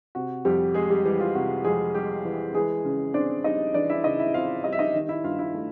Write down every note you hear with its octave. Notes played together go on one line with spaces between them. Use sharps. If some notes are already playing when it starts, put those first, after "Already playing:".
C3 F#4
F2 G3 G4
G3 G#3 G#4
G3 G4
E3 G3 G4
F4
C3 F#4
F2 G#3 G#4
G3 G4
E3
E3 G#3 G#4
C#3
C4 D4 D5
G3 D#4 D#5
E3 D4 D5
E4 E5
C#3 D#4 D#5
E4 E5
C4 F4 F5
G3 D#5
E5
D#4 D#5
D#3
E4 E5
G2 F4 F5
E4 E5
A3